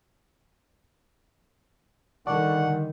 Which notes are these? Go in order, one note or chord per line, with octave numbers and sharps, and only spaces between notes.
D3 D#3 G3 D5 F#5 A5 C#6